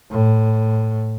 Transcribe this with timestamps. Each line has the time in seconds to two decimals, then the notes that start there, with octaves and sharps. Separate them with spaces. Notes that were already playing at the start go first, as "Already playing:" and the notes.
0.11 A2